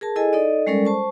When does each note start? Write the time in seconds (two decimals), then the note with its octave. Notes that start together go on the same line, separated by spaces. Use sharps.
0.01 G#4 A#4 A5
0.16 E4 G#4 A4 D#5 G#5
0.33 D#4 A4 D5 D#5
0.67 G3 G#3 C#4 A4 A#4 D5
0.85 C5 A5 C#6